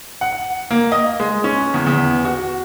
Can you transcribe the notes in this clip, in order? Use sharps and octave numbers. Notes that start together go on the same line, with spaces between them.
F#5
A#3
D#5
G#3
C#4
E2
E2
F#4